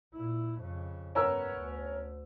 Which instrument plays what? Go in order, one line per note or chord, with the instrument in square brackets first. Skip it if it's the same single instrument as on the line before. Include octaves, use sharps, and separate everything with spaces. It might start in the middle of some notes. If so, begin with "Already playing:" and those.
[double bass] A#2 E4
F2 C#3
[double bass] G2 B3 [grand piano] C#4 A#4 E6
[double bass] D2